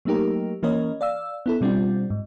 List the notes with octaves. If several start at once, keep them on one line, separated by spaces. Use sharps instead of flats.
F#3 A3 A#3 D#4 G4 A#4
E3 A#3 C#4 A#4 C#5 D#5
D5 F5 E6
B3 E4 A4
B2 G3 C4 D4 F4
G#2